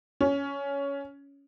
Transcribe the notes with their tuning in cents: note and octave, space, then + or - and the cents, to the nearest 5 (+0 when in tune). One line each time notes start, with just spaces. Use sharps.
C#4 +10